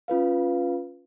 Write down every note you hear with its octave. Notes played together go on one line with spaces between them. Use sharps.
C#4 F4 B4 F5